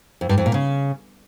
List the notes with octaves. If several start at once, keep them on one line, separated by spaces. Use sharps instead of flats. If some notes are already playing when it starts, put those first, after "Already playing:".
F2
G2
F2
A#2
C#3